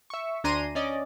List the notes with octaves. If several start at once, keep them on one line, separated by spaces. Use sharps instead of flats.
E5 C#6
D2 D4 G#5 A#5 C6 D#7
C#4 D5 D#5